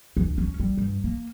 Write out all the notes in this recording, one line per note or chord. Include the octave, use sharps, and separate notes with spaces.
D2
C#4
G3
G2
A#3